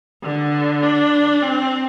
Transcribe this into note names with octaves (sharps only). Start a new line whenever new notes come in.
D3
D4
C4